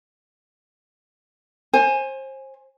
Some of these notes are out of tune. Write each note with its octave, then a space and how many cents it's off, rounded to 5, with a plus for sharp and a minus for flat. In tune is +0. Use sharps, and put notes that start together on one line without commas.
C5 +30 G#5 +0